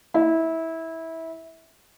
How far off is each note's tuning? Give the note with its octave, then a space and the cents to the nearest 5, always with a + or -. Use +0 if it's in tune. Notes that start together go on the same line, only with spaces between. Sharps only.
E4 -20